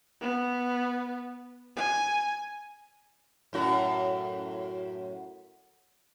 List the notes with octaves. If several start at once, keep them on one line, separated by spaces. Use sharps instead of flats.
B3
G#5
F#2 A2 F#4